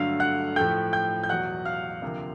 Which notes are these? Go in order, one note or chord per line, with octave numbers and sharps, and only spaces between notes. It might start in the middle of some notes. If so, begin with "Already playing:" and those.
Already playing: G2 D3 F#3 A3 F5 F6
F#5 F#6
A2 F3 A3 G5 G6
G5 G6
G6
E2 B2 F#3 F#5 F#6
F5 F6
D2 C3 F3 A#3